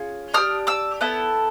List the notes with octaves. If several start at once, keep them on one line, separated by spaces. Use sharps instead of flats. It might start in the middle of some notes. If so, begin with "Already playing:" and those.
Already playing: C#4 F4 G#4
D4 G4 D#6 F6
D6 E6
B3 E4 A4